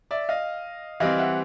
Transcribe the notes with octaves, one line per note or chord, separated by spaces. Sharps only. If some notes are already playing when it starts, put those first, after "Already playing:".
D5 E5
D#5 F5
E3 G3 C4 D#5 F5
E5 F#5